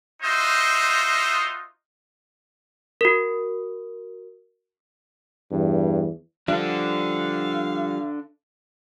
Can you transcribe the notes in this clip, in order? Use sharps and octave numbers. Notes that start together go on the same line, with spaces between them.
D#4 F4 F#4 C5 D#5 E5
F#4 A#4
E2 G2
F3 G3 D4 A4 F5